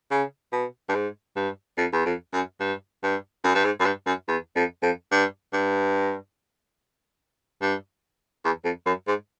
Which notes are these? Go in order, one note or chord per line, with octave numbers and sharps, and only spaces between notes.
C#3
B2
G2
G#2
G2
F2
E2
F2
F#2
G2
G2
F#2
G2
G#2
F#2
G2
F#2
E2
F2
F2
G2
G2
G2
E2
F2
F#2
G#2